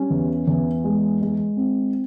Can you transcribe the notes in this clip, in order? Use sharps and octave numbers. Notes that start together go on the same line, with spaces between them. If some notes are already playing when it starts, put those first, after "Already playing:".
Already playing: G3 C#4
E2
E2
G#3
G#3
C4